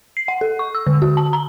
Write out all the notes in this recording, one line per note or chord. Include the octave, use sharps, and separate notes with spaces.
C7
F#5
A4
C#6
E6
D3
F#4
A5
A#5